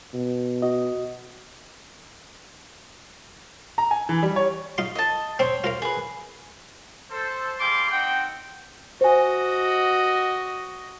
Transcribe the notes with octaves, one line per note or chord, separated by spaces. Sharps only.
B2
F#4 D#5
A#5
G#5
E3
G3
C#5
D#4 F4 C6
D#5 A5
C4 C5 C#5
F4 A#4 F5
G#4 B4
A4 C5
G3 G#4 F5 G5 C6 D6
C4 D#4 F#5 G5
F#4 C5 D#5 G#5